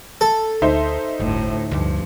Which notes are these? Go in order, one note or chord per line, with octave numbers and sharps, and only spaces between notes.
A4
D2 D#4 C5 E5
G1 D2 A2
D2 G2 F3